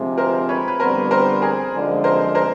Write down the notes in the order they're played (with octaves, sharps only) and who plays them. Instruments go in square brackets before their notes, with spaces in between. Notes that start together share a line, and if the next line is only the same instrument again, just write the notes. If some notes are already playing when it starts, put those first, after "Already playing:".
Already playing: [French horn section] D2 C3 F3 G#3
[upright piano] A#4 C5
B4 C#5
B4
[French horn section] F2 D3 G3 B3 [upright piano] A#4 C5
[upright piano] A#4 C5
G#4 A#4
[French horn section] F#2 D3 F3 G#3
[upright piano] A#4 C5
A#4 C5